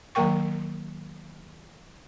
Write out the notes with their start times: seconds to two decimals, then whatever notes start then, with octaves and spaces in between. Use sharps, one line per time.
0.15 D#3 F#3 A#3 A#4 G5 C#6